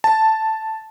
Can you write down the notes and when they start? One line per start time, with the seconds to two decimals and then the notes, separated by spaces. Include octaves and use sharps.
0.04 A5